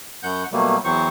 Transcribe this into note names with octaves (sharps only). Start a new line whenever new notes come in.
F#2 F#5 G6
B2 F#3 G3 A3 A#3
E2 E3 F#3 C4 C5 C#6